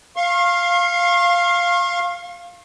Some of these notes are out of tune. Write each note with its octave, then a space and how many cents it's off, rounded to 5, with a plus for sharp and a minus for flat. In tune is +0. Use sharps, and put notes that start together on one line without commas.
F5 +0 C#6 -45